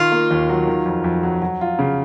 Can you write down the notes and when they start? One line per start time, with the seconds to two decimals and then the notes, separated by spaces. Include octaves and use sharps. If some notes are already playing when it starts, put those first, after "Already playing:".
Already playing: D#3 F4
0.12 A#3
0.31 D#2
0.49 F#3
0.67 D#3
0.86 F2
1.04 F2
1.23 F#3
1.42 F#3
1.61 F4
1.79 C#3